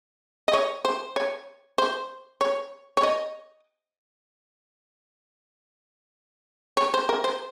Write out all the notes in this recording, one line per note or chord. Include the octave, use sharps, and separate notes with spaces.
D#5
C#5
C5
C#5
C5
C#5
C#5
D#5
C#5
C5
A#4
C5